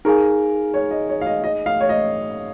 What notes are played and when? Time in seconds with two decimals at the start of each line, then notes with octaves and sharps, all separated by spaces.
0.05 D#4 G#4 A#4 F5 G#5
0.74 C#5
0.91 D#5
1.09 C#5
1.21 F5
1.26 D#5
1.44 D#5
1.66 F5
1.81 C#5
1.89 D#5